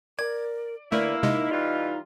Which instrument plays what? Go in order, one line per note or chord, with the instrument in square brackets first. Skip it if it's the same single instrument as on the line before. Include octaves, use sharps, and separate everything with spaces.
[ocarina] A#4 [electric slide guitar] D5 [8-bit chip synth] G#6
[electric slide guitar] D3 B4 [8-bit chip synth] A3 [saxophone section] A#3 E4 [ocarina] D5
[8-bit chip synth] C3 G#3 [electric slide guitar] D#4 [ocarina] D#5
[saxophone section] E3 G3 F4